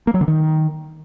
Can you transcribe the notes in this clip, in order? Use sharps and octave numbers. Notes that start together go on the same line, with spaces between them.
A#3
F#3
D3
D#3